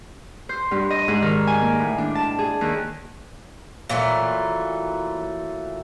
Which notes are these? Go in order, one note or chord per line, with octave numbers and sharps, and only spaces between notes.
C5
G2
D#5
G#2
D#3
G#5
A#3
A2
D4
A5
G#4
D#2
A#2 E3 F#3 A3